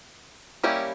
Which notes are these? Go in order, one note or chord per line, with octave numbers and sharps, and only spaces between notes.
G3 A#3 C#4 E4 G4